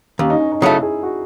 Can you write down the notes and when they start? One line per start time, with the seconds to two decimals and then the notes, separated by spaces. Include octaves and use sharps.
0.19 D#2 C#4
0.30 D#4
0.40 C#4
0.52 D#4
0.61 C#3 F#3 A3 E4
0.83 G#4
1.03 F#4